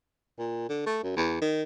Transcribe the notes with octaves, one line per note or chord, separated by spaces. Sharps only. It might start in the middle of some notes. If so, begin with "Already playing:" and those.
A#2
D3
A3
F#2
E2
D#3